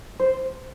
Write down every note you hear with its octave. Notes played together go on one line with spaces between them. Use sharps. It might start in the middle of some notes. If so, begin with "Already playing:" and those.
C5